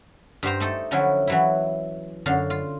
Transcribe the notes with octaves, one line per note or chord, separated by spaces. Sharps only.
G2 G4 C5 A#5
A3 D#4 A4
D3 F3 F#3 C#4 E4
E3 F#3 E4
F#2 D3 F5
F4